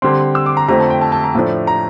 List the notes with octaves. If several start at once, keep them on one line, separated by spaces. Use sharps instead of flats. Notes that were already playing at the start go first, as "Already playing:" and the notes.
D3 G3 C4 C6
E6
D6
A#5
F2 D3 F3 A3 C4 A#5
A5
G5
A5
A5
A#5
A2 F3 A3 D4
A#5